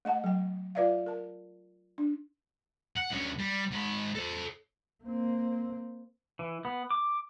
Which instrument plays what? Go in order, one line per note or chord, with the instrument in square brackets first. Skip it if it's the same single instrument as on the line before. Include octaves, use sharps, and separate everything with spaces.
[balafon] A3 D#5 F#5 A5
F#3 G5
F4 B4 D5 E5 F5
A#4 A5
D4
[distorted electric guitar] F#5
D2 C#4
G3
G#2 B5
A4 C5
[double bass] A#3 C4
[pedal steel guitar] E3
B3
D6